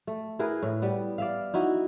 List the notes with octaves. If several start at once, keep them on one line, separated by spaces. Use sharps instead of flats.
A3
E4 G#4 A#4 B4
A2
G3 B3
D5 E5 F5
D#4 E4 F#4